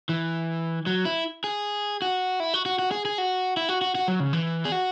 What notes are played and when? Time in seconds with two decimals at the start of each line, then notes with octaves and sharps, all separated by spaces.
0.09 E3
0.86 F#3
1.05 E4
1.44 G#4
2.02 F#4
2.40 E4
2.54 F#4
2.66 F#4
2.79 F#4
2.91 G#4
3.05 G#4
3.18 F#4
3.57 E4
3.69 F#4
3.81 F#4
3.95 F#4
4.08 F#3
4.20 C#3
4.33 E3
4.65 G#4
4.72 F#4